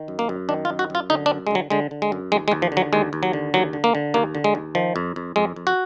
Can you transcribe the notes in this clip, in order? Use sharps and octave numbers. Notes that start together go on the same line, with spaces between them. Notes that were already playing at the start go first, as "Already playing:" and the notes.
Already playing: D#3
F#2
A#3
F#2
D#3 D4
F4
F#2
F#4
F#2 F4
D3 D#4
D4
F#2
G#3
D3 F#3
D3 G#3
D3
G#3
F#2
D#2 G#3
G#3
D#2
F3
D3
F#3
D#2 G#3
D#2
F#3
D3
D#2 F#3
D3
A#3
D3
D#2 A#3
D3
G#3
D#2
D#3 F3
F2
F2
F2 G#3
F2
F#4